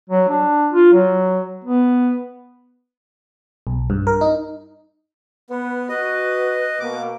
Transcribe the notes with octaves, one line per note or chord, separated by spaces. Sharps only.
F#3
D4
F4
F#3
B3
B1
G2
A#4
D#4
B3 B4
F#4 B4 D#5
B2 A#3 D6